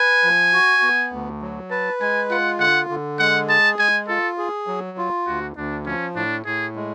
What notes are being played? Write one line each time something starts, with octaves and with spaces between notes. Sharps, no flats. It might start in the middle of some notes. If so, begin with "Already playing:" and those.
Already playing: B4 G#5
F3
F#4
B3
D2
F#3
B4 A5
G#3 G#5
F4 F#5
D3 F#5
D3
G#3 F#5
G#4 A5
G#3 G#5
F4 A4
G#4
F#3
F4
D2 F#4
D2 D4
F3 C#4
A2 D4
A2 G#4
G#3